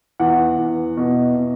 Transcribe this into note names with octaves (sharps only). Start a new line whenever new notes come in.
E2 F#5
E2
B2
B2